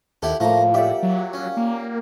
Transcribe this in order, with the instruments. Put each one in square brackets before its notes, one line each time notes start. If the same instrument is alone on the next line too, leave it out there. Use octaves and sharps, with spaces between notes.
[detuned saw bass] D#2 [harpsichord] E4 G4 A4 [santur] F#5
[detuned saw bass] A2 [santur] F3 A#3 [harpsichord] A3 A#5
[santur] G4 D5 F#5 [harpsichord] E5
[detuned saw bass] F#3
[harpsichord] C#4
[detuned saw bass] A#3